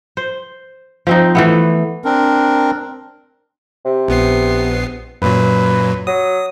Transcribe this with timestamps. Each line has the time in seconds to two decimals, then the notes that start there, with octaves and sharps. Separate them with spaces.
0.17 C5
1.07 F3 C4 D#4
1.35 E3 A3 B3
2.04 C4 D4 A#4
3.85 C3
4.08 A#1 B3 C7
5.22 F#2 A#2 F#3 B4
6.07 F#3 D#6